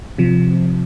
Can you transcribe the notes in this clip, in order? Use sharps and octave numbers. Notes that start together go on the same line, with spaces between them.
C3 F3